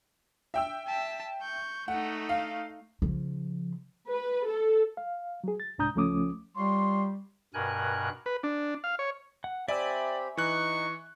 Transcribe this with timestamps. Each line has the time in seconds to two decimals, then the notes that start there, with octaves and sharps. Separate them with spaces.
0.54 E5 G5 E6
0.87 A5 B6
1.42 C#6 G6
1.88 A3 D#4 F#5
2.29 F5
3.02 C#3 F3
4.10 B4
4.48 A4
4.97 F5
5.44 F#3 G#4
5.60 A6
5.78 C2 G#2 D4 A#5 D#6 G6
5.95 C#2 F3 A3 C#4 D6 D#6
6.56 G3 F4 C#5 C6
7.54 G2 B2 A#4 G#5 F#6
8.26 B4
8.43 D4
8.84 F5
8.99 C#5
9.44 F#5
9.68 C4 G4 D5 E5 G#5 B5 E6
10.37 E3 D#4 C#6 F#6